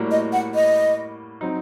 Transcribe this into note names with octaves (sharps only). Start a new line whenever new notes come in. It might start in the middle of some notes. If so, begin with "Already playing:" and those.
Already playing: A2 G3 A#3 F#4
D#5
F#5
D#5
F#3 C4 D#4